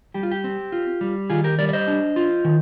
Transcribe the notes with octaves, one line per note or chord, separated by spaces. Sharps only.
G3 G4
F4
G4
C4
F4
G3
D#3 F4 G#4
G4 A#4
G3 A#4 D5
D5
C5 D#5
D4
F4
D#3